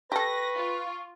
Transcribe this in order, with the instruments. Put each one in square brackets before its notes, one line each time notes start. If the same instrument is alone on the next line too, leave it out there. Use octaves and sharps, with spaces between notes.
[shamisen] G4 A4 [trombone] B4 [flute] C#6 [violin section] A#6
[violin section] F4